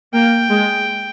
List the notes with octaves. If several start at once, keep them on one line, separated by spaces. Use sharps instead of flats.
A#3 G5
G#3